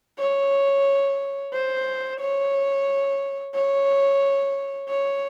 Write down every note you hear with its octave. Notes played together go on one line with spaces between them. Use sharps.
C#5
C5
C#5
C#5
C#5